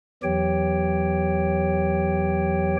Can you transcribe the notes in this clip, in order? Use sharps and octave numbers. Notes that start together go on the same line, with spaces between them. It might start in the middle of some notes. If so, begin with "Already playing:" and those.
E2 E3 F#3 G4 C#5 G5